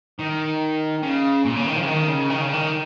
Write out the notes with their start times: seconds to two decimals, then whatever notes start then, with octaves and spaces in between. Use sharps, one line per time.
0.19 D#3
1.03 C#3
1.45 A#2
1.56 C#3
1.67 D#3
1.77 F3
1.83 C#3
1.87 D#3
2.08 C#3
2.30 D#3
2.41 C#3
2.53 D#3